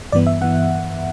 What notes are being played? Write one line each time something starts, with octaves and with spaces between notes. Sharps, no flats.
G2 E3 B3 D5
E5
E3 B3 F#5